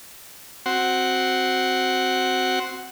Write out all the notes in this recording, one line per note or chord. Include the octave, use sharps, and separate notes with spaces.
C4 F#4 F#5 C6